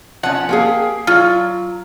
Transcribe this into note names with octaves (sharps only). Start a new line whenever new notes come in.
F3 C#4 F#5
A#3 G4 G#4
F#3 F4